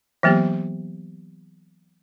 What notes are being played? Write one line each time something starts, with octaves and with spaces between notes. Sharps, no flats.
E3 F#3 A#3 B3 G4